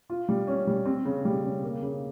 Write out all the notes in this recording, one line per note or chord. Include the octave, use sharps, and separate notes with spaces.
F4
G3
C#4
G3
C4
C#3
G3
C#3
A#3
C#3